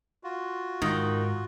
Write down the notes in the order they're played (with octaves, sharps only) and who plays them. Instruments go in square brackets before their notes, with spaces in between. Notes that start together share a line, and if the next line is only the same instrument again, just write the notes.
[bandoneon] F4 F#4
[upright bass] G#2 [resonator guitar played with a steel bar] D#3